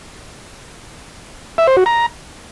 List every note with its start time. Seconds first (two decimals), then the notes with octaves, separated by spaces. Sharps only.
1.58 E5
1.67 C5
1.77 F#4
1.86 A#5